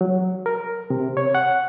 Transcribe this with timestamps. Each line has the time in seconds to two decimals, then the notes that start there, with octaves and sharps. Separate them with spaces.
0.01 F#3
0.46 A#4
0.90 C3
1.17 C#5
1.35 F#5